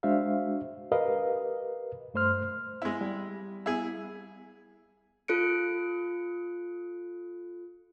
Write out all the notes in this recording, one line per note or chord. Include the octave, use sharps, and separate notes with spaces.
G#3 D4 F#4 C5 E5 F5
G4 A#4 B4 D#5 F5
G2 A3 C5 C6 F6
G#3 E4
G3
E4 G#4
F4 A4 F#6 C#7 D7